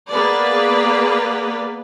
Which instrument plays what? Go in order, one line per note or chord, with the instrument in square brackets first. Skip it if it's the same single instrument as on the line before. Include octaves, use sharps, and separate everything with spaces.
[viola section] A#3 B3 G#4 B4 D5